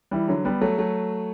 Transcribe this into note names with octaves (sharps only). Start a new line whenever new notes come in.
E3 G3
D3 F#3
G3 B3
F#3 A3
F#3 A3